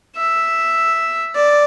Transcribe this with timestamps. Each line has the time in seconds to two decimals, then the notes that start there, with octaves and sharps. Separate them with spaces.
0.16 E5
1.35 D5